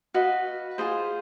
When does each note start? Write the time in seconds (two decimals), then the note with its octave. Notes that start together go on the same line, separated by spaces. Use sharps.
0.14 F#4 B4 D#5 F5
0.78 F4 G#4 C5